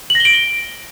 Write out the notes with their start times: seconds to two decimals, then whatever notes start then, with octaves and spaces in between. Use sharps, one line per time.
0.10 F#7
0.15 A#6
0.20 G7
0.25 D7